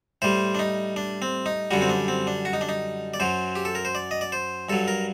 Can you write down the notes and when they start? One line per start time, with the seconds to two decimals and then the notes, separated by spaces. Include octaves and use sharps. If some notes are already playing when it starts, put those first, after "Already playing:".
0.22 A2 G3 C5
0.55 D4
0.59 D#4
0.96 D4
1.22 C4
1.46 D#4
1.71 F#2 D3 G3 F#4
1.81 C4
1.89 D4
2.08 C4
2.27 D4
2.45 F#4
2.53 D#4
2.61 D4
2.69 D#4
3.14 D5
3.20 F#2 F#3 C5
3.55 G4
3.65 A4
3.75 A#4
3.85 C5
3.95 D5
4.11 D#5
4.21 D5
4.32 C5
4.69 G2 F#3 A4
4.88 A#4